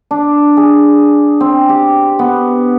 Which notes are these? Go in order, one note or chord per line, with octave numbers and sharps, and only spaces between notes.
D4
G#4
C4
G4
B3